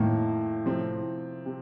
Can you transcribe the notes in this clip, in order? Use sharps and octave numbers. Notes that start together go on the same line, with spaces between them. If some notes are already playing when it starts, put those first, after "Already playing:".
Already playing: F2 A2 D#3 A#3
C3 F3 C4
C3